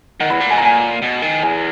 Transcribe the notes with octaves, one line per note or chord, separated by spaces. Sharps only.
D#3 F#5
E2 B5
A#2
B2 G#5
A#5
A#2 G#5
B2
D#3
E2 G#5